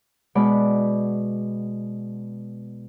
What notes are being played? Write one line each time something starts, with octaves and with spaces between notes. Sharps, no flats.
B2 G#3 D5 F#5 B5